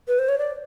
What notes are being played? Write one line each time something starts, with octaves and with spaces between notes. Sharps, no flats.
B4
C5
C#5
D5